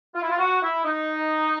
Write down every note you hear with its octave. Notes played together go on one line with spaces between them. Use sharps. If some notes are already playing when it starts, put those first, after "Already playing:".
F4
E4
F4
F#4
E4
D#4